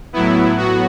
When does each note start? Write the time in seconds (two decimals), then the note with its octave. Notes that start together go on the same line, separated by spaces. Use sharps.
0.13 A2 F#3 B3 E4
0.58 F#4